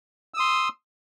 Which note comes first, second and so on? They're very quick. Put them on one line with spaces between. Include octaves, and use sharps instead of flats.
E6 D#6 C6